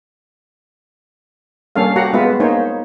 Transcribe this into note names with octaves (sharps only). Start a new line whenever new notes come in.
G3 A#3 C#4 A4 F5
F#4 G4 F#5 A#5
G#3 B3 F4 B4 E5
A#3 D#4 C5 C#5